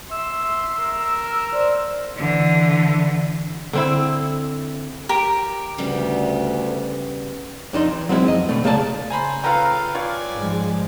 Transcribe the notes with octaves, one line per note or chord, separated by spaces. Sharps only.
E5 C6 E6
A#4
C5 D5
D3 E3
D3 C4 E4
G4 A#4
D2 C#3 G3 B3
F2 D4 D#4 C6
E3
F#3 G#3 C4 E4
F2 D#5
B2 D3 A3
C#2 A#3 G#4 A4 D5 A5
C#3 C5 G#5 A#5 B5
F4 A4 B4 F5 G5 A#5
F4 C#5 D5 G#5
G#2 F3 G#3